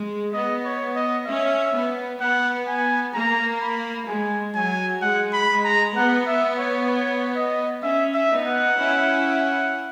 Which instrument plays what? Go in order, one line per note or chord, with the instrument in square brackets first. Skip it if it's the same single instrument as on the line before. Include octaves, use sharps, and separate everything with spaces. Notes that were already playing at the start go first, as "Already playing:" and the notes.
Already playing: [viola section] G#3
[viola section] B3 [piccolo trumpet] D#5
[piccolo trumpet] C#5
D#5
[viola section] C#4 [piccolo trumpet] E5
[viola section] B3
[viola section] B3 [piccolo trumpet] F#5
[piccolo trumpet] G#5
[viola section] A#3 [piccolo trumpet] A#5
[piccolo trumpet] B5
[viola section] G#3 [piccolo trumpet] G#5
[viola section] F#3 [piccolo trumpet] G#5
[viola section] G#3 [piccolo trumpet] F#5
[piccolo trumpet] B5
[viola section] G#3
[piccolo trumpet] A#5
[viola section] B3 [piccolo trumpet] F#5
[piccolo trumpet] E5
C#5
C#5
D#5
[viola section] C#4 [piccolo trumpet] E5
[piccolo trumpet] E5
[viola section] B3 D#4
[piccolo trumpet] F#5
[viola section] C#4 E4